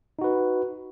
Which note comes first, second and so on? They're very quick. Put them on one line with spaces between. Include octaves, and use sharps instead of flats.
D#4 F#4 B4